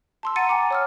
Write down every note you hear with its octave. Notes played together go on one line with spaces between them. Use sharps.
A5 C6 E6
F#5 A#5 A6 C#7 D#7
G5 G#5 A#5 D6
C#5 E6 F6